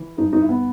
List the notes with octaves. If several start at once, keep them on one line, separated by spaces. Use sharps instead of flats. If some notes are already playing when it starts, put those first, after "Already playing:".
Already playing: E3
G2 D#4
D#4
E4
B3